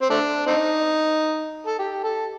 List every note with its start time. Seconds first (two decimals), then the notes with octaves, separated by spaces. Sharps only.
0.02 C4
0.10 A3 D4
0.47 C4 D#4
1.67 A4
1.79 G4
2.04 A4